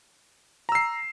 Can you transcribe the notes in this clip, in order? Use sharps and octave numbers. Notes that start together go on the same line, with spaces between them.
A#5 E6 C7